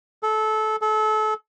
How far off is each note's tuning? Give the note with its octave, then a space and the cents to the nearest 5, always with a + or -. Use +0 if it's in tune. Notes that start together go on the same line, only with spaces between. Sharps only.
A4 -20
A4 -30